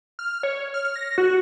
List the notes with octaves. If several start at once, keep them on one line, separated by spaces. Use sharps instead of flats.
F6
C#5
F6
A#6
F#4